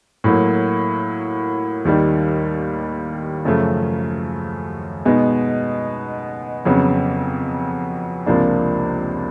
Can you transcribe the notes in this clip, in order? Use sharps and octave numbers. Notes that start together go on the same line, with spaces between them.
A2 F#3 A#3
D#2 D#3 G3
F#2 C#3 F3 A3
B2 G#3 B3 D#4
F2 C#3 F#3 B3
C#2 C3 F3 A#3 D4